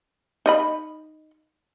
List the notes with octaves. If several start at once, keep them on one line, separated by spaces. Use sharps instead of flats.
D#4 D#5 B5